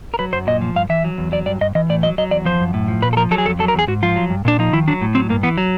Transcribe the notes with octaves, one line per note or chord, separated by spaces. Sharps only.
A#4
F#3 B4
F#2 C5
A#2 D#5
F3
G2 F5
E3 E5
F#3
E2
F#3 D5
G2 D5
G2 D#5
E3 D#5
A2 D5
F#3 D#5
F#3 D#5
E2 D5
F3 C5
F#2
A2
F3
A#2 B4
A4
F3 A#4
F#3 A4
G#4
F2 A4
F#3 A4
A#4
E2 G#4
G#2 F#4
F3 F4
F#3
G2
A#2 D4
F3 D#4
D#3 E4
F#3 D4
A2
F#3 C4
G2 A#3
E3 B3
F#3